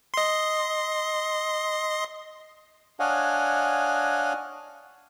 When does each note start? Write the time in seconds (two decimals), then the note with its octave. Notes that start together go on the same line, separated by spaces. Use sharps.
0.14 D#5 C6
3.00 D4 C#5 D#5 F5 F#5 G#5